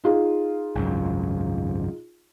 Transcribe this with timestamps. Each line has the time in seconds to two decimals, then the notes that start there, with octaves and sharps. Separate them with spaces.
0.04 D#4 F4 G#4
0.76 G#1 C#2 F#2